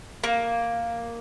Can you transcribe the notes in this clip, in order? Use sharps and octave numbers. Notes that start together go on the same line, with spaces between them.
A#3